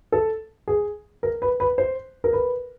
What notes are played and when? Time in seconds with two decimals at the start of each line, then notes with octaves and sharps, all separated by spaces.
0.12 A4
0.68 G#4
1.23 A#4
1.42 B4
1.60 B4
1.78 C5
2.24 A#4
2.33 B4